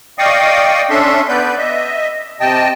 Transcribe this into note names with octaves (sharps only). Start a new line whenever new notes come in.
D5 D#5 F5 G5 C#6 D#6
C#4 D4 A4 E5 C6
B3 B4 D5 G6
D#5 E5
C3 D#5 G5 A5